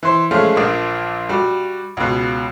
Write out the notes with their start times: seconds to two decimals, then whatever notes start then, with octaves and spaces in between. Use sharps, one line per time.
0.03 E3 C5
0.31 F3 G#3 A3 C#4 F4
0.55 A#1 A#2 F3 A#3
1.29 G3 F#4
1.97 C#2 B2